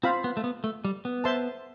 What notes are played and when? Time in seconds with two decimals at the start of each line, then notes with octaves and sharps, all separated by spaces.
0.03 C4 F4 C5 F5 B5
0.24 B3
0.37 A3
0.44 B3
0.64 A3
0.85 G3
1.05 B3
1.24 C5 E5 A5 C6